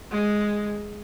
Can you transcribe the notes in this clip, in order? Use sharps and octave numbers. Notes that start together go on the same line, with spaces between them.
G#3